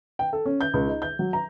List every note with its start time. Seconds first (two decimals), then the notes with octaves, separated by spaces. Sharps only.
0.19 G5
0.33 A4
0.45 C#4
0.61 G6
0.74 C#2
0.87 D#4
1.02 G6
1.19 F#3
1.33 A#5